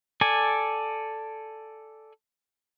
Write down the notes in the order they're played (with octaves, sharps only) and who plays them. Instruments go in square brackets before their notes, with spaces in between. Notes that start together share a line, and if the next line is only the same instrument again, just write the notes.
[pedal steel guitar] A4 D5 G#5